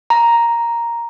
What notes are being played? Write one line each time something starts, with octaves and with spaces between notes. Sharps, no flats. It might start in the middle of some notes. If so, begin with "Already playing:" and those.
A#5